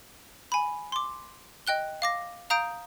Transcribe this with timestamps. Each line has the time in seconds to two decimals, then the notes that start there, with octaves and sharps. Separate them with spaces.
0.52 G#5 B5
0.92 C6 D6
1.67 D#5 G5 F#6 G7
2.02 F5 D6 A#6
2.50 F5 A#5 D#6 G6 D7